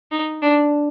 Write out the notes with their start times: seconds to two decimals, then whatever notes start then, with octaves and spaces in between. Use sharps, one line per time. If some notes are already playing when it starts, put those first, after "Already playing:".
0.11 D#4
0.42 D4